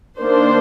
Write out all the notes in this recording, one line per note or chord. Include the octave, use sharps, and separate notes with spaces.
D#3 A#3 D4 C5